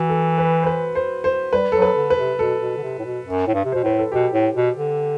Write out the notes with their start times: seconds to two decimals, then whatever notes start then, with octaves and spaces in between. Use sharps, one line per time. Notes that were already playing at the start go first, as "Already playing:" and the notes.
Already playing: E3 F#4
0.09 A4
0.38 B4
0.63 C5
0.67 B4
0.95 C5
1.24 C5
1.52 G3 B4
1.72 F#3 A4
1.82 B4
1.96 D3
2.10 B4
2.18 C3
2.39 B2 A4
2.61 B2
2.78 D3
2.83 C3
2.99 A2
3.04 B2
3.26 F#2
3.47 A2
3.54 G2
3.65 C3
3.72 B2 C5
3.83 A2 B4
3.99 A4
4.12 B2 G4
4.33 A2
4.55 B2
4.77 D3